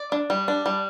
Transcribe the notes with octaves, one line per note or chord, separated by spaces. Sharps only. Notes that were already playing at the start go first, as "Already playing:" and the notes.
Already playing: D5
D4
G3
D4
G3